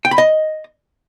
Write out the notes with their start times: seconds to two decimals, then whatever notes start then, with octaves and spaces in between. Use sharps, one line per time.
0.05 G5
0.11 B5
0.18 D#5